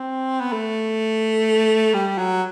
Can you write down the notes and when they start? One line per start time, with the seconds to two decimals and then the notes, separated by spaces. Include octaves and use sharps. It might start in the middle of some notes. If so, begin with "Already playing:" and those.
Already playing: C4
0.41 B3
0.53 A3
1.94 G3
2.18 F#3